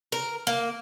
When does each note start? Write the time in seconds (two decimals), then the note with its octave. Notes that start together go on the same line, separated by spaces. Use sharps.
0.12 A#4
0.47 A#3